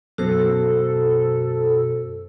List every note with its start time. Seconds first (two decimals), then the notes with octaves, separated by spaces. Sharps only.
0.18 F#2 B2 F#4 A4 C5